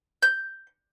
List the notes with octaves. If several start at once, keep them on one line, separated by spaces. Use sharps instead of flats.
G6